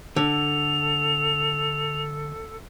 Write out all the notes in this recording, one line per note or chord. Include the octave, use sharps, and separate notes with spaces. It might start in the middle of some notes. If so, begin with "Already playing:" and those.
D3 A4 F7